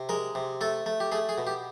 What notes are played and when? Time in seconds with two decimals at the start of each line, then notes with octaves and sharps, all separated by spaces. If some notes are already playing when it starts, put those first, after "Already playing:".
Already playing: C3
0.09 G#3 A#4
0.35 C3
0.61 A3 A4
0.86 A3
1.00 G4
1.12 A3 G#4
1.29 G#4
1.38 B2
1.47 G4